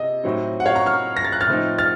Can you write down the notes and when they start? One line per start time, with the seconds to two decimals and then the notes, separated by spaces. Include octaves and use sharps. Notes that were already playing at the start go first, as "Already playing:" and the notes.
Already playing: C3 D#5
0.24 A2 F#3 C4 D#4
0.60 F#5
0.65 C#5 F5
0.75 A#5 C#6
0.86 C#6 F6
1.17 A#6
1.24 A6
1.33 F#6
1.41 F6 A6
1.47 A2 F3 C4 D#4
1.78 F6 A6